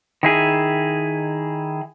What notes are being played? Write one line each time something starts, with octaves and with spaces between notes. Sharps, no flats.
D#3 E4 G#4